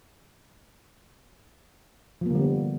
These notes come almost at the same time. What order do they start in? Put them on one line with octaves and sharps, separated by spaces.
F3 A#3 D3 G3 B3